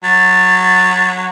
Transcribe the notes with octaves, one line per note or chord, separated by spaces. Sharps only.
F#3 A6